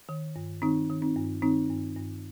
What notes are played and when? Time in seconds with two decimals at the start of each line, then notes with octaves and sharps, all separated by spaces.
0.09 D#3
0.36 G2
0.62 D#3 C4 D#4
0.90 D#3
1.02 C4 D#4
1.16 G2
1.42 D#3 C4 D#4
1.70 G2
1.96 G2